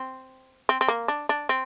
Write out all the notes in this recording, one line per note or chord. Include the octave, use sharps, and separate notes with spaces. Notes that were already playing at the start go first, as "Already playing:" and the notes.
Already playing: C4
C4
C4
A#3
D4
D4
C4